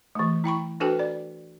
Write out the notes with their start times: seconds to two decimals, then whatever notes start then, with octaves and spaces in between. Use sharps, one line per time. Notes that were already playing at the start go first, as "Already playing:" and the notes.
0.15 E3 A3
0.44 E4 G5 B5 C#6
0.80 D4 F#4 A4 B4 C5 G5
0.99 D5